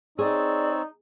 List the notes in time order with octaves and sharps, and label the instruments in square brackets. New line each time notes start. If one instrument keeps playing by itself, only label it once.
[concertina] C4 C#5 E6 [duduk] D#4 [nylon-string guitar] G#4 [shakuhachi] D5